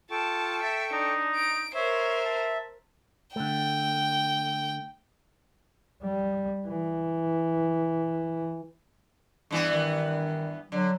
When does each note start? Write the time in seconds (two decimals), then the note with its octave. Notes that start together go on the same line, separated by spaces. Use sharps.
0.11 F4 A4 G5 A5 C#6
0.63 E5 A5
0.92 D4 D#4
1.35 D7
1.75 A#4 C5 C#5 E5
2.25 A5
3.36 D3 A3 G5
6.03 G3
6.67 E3
9.51 G2 E3 B3
9.70 D#3
10.72 D3 F#3